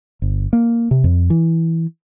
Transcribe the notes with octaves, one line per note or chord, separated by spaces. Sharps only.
G1
A#3
C3
F2
E3